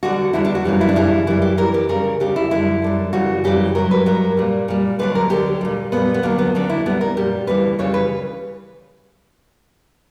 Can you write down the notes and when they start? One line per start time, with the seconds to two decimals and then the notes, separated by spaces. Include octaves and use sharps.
0.03 E2 D3 G3 F#4
0.33 E2 D3 G3 E4
0.45 D4
0.55 F#4
0.65 F#2 C#3 E3 G3
0.81 E4
0.89 D4
0.96 F#2 C#3 E3 G3 E4
1.27 F#2 E3 G3 E4
1.42 G4
1.57 F#2 E3 G3 A#4
1.74 G4
1.89 D2 C#3 G3 A#4
2.20 D2 C#3 G3 G4
2.36 E4
2.51 F#2 D3 G3 E4
2.82 F#2 D3 G3
3.13 F#2 C#3 E3 G3 F#4
3.44 F#2 C#3 E3 G3 G4
3.75 G2 F#3 A#4
3.91 B4
4.06 G2 F#3 A#4
4.37 A#2 G3
4.68 A#2 G3
4.99 D2 D3 F#3 B4
5.15 A#4
5.30 D2 D3 F#3 G4
5.61 A#2 G3
5.92 A#2 G3 B3
6.14 B3
6.23 D2 D3 F#3 A#3
6.38 B3
6.55 D2 D3 F#3 C#4
6.70 E4
6.86 A#2 G3 B3
7.01 A#4
7.17 A#2 G3 G4
7.47 D2 C#3 E3 G3 B4
7.79 D2 C#3 E3 G3 C#5
7.94 B4